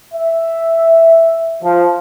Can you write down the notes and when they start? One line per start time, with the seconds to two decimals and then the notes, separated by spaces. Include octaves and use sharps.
0.14 E5
1.63 F3